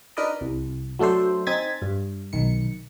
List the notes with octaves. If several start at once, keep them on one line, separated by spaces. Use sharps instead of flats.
D4 D#4 A#4 B4 D5 D#5
C2
F#3 A3 D4 A4 C5
C4 D#4 G#5 G#6 A6 B6
G2
B1 D#3 C#7